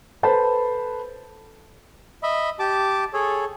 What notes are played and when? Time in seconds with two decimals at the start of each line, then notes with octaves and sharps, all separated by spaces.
0.23 A4 B4 C5 A5 B5
2.23 D#5 E5 B5
2.59 G4 A5 D6
3.13 G#4 A4 C#5